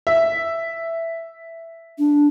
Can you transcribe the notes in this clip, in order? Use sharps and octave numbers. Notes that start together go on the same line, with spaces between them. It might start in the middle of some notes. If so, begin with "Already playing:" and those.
E5
D4